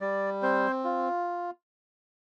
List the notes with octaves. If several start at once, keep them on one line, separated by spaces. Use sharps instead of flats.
G3 D5
C4 C5
F4